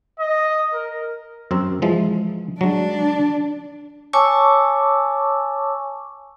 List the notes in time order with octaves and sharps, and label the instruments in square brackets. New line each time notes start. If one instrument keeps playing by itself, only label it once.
[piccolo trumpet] D#5
A#4
[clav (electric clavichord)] F#2 C4 A#4
E3 F3 G#3
[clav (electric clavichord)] F#3 G#3 [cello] D4
[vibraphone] C#5 G#5 A5 C#6 D6 E6